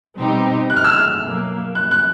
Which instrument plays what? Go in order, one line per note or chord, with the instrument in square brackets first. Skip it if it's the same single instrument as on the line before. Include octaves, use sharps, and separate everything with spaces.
[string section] B2 G3 C4 D#4 G4
[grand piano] F#6
F6
E6
F6
[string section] B2 F#3 A#3
[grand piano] F#6
F#6